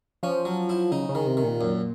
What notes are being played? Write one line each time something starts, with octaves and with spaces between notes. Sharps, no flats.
F3 C#4
F#3
E4
C#3 D#4
C#3
D#3
C3
D#3
A#2
F#2